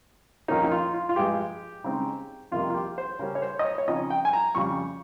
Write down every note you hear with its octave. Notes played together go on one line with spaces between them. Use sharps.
F2 D#3 A#3 C#4 D#4
D#4
F4
F4
F4
G2 F3 G#3 G4
C#3 G#3 C4 D#4
F2 C3 D#3 G3 A#3 F4
F4
G4
C5
C#3 G3 C#4 A#4
C#5
C5
D#5
C#5
C#5
C#3 F3 C4 D#4 D#5
G5
G#5
A#5
F2 C#3 G3 C#6